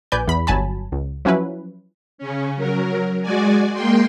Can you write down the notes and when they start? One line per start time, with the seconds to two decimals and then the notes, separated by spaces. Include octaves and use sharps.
0.12 A#1 B4 D5 G#5 G6
0.28 E2 B5
0.47 G1 F#3 G#5 A5 B5
0.92 C#2
1.25 F3 F#3 C#4 E4 B4
2.18 C#3 C#4
2.56 F#3 A#4
3.22 G#3 F#4 D5 G#5
3.73 G#3 A#3 G5 C6